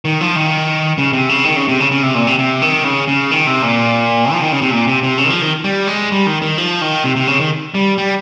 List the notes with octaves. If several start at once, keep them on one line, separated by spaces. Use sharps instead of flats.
D#3
F3
D#3
C#3
C3
C#3
D#3
C#3
C3
C#3
C#3
C3
A#2
C3
C3
D#3
C#3
C#3
D#3
C3
A#2
F3
D#3
C#3
C3
A#2
C3
C3
C#3
D#3
F3
D#3
G3
G#3
G3
D#3
D#3
F3
D#3
C3
C3
C#3
D#3
G3
G3